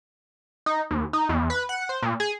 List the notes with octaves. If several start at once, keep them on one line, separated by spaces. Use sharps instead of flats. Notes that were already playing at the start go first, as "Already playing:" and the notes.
D#4
D#2
D#4
E2
B4
F#5
C5
A#2
G#4